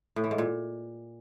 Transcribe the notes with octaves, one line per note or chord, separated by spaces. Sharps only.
A2
E3
G#2
A#2